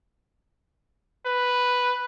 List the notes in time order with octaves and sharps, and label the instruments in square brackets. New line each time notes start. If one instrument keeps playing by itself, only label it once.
[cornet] B4